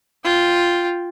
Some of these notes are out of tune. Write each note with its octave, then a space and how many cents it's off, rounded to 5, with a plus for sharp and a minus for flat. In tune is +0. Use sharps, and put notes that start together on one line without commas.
F4 +0 G5 +0